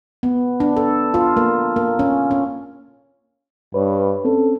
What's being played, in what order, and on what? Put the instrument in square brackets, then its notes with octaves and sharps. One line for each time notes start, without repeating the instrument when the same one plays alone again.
[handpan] B3
D4
A4
F4
A#3
A#3
C#4
C#4
[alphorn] G2 [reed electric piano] B4 C#5
[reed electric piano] C4 C#4 [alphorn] A4